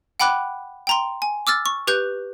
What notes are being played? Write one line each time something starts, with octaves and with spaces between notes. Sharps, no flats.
F#5 G5 B5 D6 F#6
G5 A#5 C6
G#5
D6 E6 F6 A6
C#6
G4 B4 F#6 G6